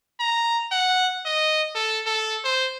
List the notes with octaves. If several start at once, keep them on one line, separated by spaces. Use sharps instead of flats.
A#5
F#5
D#5
A4
A4
C5